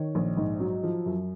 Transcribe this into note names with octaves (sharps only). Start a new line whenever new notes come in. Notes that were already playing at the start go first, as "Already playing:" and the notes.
Already playing: D#3 C#5
A#1
G#2
F#3
F3
F#2